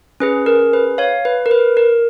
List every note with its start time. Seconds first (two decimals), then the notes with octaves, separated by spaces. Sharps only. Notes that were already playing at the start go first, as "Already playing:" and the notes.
0.20 C#4 G#4 B4
0.46 A#4
0.73 B4
0.98 C#5 F5
1.25 B4
1.46 A#4
1.51 B4
1.77 A#4